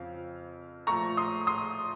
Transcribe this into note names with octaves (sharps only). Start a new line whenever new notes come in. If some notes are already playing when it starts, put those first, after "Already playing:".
Already playing: F2 C#3 C4 F5
A#2 F3 A3 A#5 C#6
C6 D#6
C6 D#6